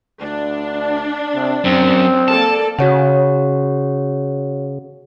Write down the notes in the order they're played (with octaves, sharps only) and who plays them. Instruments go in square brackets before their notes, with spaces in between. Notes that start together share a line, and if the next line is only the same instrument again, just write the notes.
[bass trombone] D2 [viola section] D4
[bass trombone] C3
[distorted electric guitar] F#2 [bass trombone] C4
[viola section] A#3 A4 D5 [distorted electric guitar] A5
[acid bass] C#3 [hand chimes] F#4 C#5 F#5